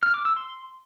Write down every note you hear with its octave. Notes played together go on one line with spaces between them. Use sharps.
F6
D6
E6
C6